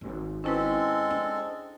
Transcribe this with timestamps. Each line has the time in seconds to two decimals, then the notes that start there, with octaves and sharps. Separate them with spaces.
0.01 G#1
0.44 G#3 C4 C#4 E4 A4 B4
1.11 D4